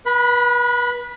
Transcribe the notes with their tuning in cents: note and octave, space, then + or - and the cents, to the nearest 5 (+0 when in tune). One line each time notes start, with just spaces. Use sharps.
B4 -35 B5 +5